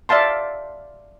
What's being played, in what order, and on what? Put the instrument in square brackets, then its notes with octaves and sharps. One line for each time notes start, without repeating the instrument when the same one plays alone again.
[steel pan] D5 E5 F5 A5 C6